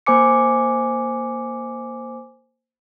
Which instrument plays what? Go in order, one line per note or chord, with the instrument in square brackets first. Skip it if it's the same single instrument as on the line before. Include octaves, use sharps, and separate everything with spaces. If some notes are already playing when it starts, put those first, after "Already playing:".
[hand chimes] A#3 C5 G#5 D6 C#7